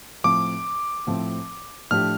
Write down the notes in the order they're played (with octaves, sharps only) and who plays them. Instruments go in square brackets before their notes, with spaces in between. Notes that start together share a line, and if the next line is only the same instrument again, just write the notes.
[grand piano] A2 F3 C4 [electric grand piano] D6
[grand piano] A2 F3 C4
[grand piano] A2 F3 D4 G4 [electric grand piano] F6